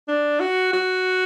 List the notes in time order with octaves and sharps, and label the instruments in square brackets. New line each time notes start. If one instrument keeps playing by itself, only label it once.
[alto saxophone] D4
F#4
F#4